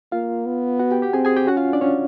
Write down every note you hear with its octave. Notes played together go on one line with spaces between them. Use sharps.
A#3 F4 F5
B3
F#4 F#5
G4 G5
G4 G5
C4 G#4 G#5
G#4 G#5
G4 G5
C#4 F#4 F#5
F4 F5
D4 D5
C#4 C#5